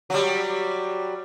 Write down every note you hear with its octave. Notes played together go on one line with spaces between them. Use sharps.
F#3 G3